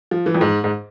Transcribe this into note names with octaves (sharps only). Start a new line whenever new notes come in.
F3
E3
F2
G#2
G#2